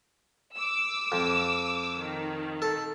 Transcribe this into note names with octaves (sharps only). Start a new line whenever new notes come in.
D6 E6
F2
D#3
A4